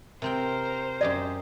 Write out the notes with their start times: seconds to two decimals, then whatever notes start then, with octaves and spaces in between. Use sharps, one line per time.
0.22 C3 C4 A#4 C5 G5
1.01 F#2 G4 D5 D#5